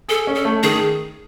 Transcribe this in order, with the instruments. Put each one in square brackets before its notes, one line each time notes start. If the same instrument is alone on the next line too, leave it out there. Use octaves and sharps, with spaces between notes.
[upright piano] G#4 [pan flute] A4
[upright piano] C#4
[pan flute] A4
[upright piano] A3
[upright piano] D#3 [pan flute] G#4